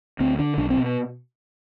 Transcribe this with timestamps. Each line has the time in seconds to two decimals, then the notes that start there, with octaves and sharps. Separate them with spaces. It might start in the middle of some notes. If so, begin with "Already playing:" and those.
0.20 D2 C4
0.39 D3 D4
0.58 B1 D4
0.70 C4
0.77 B2